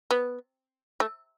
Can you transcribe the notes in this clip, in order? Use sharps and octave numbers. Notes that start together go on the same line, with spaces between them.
B3
A3